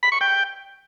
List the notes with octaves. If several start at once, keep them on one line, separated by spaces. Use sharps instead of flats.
B5
C#6
G5